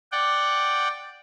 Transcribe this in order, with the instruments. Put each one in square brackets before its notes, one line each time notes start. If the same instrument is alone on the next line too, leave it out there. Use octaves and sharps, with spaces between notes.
[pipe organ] D5 F#5 G5